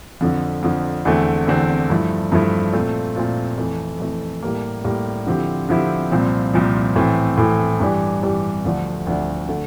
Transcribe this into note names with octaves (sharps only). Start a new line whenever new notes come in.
F2 D3 F3
F2 D3 F3
E2 D3 A3 C4
E2 D3 A3 C4
G2 F3 A3 E4
G2 F3 A3 E4
A#2 A3 C4 F4
A#2 A3 C4 F4
F2 E3 A3
F2 E3 A3
A2 G3 A#3
A2 G3 A#3
D3 F3 C4 E4 G4
D3 F3 C4 E4 G4
C2 A#2 F3 C4
C2 A#2 F3 C4
A2 E3 A3 C4
A2 E3 A3 C4
G2 E3 G3 D4 G4
G2 E3 G3 D4 G4
D2 D3 F3 A3 D4
D2 D3 F3 A3 D4
D3 A3